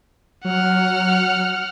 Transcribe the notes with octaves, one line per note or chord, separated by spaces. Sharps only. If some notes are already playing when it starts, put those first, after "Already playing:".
F#3 F#5 F6